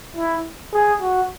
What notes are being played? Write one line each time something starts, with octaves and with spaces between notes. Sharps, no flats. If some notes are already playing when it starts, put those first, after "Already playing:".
E4
G#4
F#4